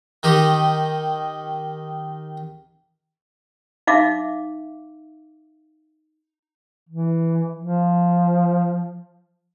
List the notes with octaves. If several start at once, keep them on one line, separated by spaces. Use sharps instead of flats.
D#3 D#4 G4
D#4 E5 F5 D6
E3
F3